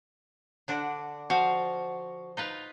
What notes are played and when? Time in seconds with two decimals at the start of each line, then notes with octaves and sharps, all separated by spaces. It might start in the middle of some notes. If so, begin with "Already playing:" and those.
0.68 D3 D4 F#4
1.30 F3 F#4 C5 F5
2.37 D#4 F4 B4